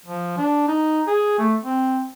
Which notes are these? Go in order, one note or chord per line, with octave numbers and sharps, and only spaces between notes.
F3
D4
D#4
G#4
A3
C4